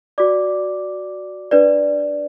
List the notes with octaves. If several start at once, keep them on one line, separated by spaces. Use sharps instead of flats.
F#4 D5 D6
D4 B4 D5